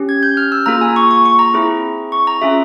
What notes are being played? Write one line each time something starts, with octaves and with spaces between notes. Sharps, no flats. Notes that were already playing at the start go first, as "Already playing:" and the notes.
Already playing: C#4 G4
G#6
G6
F6
E6
A#3 F4 G#4 A#5
G#5
C#6
C#6
C#6
A#5
C4 E4 G#4
C#6
A#5
C#4 F4 G#4 E5